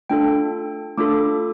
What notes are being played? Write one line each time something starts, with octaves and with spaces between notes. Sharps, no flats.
A3 D4 F4 A4 G5
A3 D4 F4 A4 D6